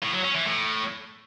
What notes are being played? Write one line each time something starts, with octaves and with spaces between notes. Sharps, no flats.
A2
F#3
C#4
E3
A2